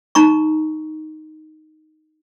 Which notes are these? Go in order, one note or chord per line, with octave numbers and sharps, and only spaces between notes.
D#4 A#5 C#6